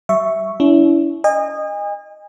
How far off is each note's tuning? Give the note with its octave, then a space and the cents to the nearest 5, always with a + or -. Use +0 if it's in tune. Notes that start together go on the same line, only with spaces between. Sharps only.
G3 -45 E5 +0 C#6 +0
C#4 +45 E4 +0
D#5 -15 G#5 -40